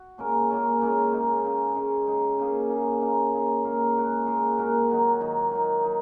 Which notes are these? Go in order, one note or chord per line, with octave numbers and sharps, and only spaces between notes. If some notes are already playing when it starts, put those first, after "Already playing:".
Already playing: F#4
A#2 G#3 C#4 A#4
A#2 G#3 C#4 A#4
A#2 G#3 C#4 A#4
C#3 G#3 D#4
C#3 G#3 D#4
C#3 G#3 D#4
C#3 G#3 D#4
C#3 A#3 D#4 G#4
C#3 A#3 D#4 G#4
C#3 A#3 D#4 G#4
C#3 A#3 D#4 G#4
A#2 G#3 F#4 A#4
A#2 G#3 F#4 A#4
A#2 G#3 F#4 A#4
A#2 G#3 F#4 A#4
D#3 F#3 D#4
D#3 F#3 D#4
D#3 F#3 D#4
F#3 D#4